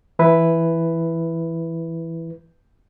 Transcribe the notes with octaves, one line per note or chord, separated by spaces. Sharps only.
E3 E4 B4